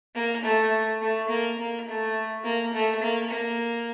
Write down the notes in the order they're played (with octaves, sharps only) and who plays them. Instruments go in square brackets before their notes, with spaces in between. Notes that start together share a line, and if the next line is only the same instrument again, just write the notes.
[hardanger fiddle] A#3
A3
A3
A#3
A#3
A3
A#3
A3
A#3
A#3